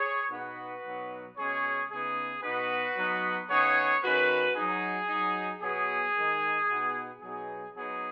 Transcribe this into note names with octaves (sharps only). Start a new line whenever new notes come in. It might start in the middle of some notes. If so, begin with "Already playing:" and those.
Already playing: G#4 C#5
B2 B3 D#4 F#4 B4
B2 F#3 D#4
B2 G#3 C#4 G#4 C#5
C#3 B3 D#4 G#4
B2 B3 D#4 F#4 B4
F#3 B3 D#4
C#3 B3 D#4 G#4 C#5
D#3 G#3 C#4 F#4 B4
F#3 D#4 G#4
F#3 D#4
B2 F#3 B3 G#4
D#3 G#3 D#4
B2 B3 D#4
B2 F#3 B3 D#4 G#4
F#3 B3 D#4 G#4